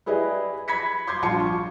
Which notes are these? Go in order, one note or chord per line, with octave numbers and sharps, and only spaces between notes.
E4 G4 G#4 B4 D5 D#5
B5 G#6 B6 C#7
C6 D6 G6 G#6
A#1 G2 F4 A5 C6 C#7
C#6